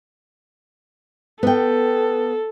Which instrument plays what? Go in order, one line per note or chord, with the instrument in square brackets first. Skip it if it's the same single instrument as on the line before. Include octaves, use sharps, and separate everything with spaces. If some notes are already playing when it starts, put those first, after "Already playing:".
[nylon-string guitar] B3 G5 [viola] A4